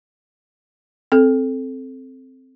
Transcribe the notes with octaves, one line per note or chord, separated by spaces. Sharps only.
C4 A4